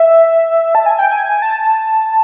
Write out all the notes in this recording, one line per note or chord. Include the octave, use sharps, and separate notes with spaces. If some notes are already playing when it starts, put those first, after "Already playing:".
Already playing: E5
A5
G#5
G5
G#5
A5